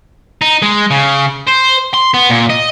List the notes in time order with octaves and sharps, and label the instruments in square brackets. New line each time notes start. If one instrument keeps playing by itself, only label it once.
[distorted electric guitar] D#4
G#3
C#3
C5
C6
B3
A#2
D#5